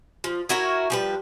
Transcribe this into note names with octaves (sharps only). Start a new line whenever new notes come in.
F3
E4 F#4 A#4 C#5
F3 G3 B4